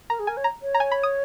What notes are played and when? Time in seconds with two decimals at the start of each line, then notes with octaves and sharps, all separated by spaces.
0.09 A#4 A#5
0.19 G#4
0.27 A#4 G#5
0.37 C#5
0.44 A#5
0.62 C#5
0.75 A#5
0.80 G#5
0.92 B5
1.03 D#6